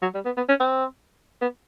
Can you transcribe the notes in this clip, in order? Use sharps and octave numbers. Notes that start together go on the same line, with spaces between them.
F#3
G3
B3
B3
C#4
C4
B3